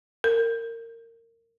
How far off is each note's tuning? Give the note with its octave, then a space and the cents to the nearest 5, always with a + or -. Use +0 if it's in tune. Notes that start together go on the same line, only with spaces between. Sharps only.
A#4 -25